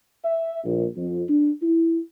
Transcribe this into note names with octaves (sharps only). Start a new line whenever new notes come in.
E5
A#1
F2
D4
E4